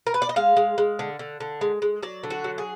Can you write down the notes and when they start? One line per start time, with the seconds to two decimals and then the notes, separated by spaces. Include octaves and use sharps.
0.07 A#4
0.14 B4
0.22 D5
0.29 D#5
0.36 G#3 F5
0.57 G#3
0.78 G#3
0.99 D3
1.19 D3
1.40 D3
1.61 G#3
1.82 G#3
2.03 F#3 D5
2.24 D3
2.30 F#4
2.44 F#3
2.58 G#4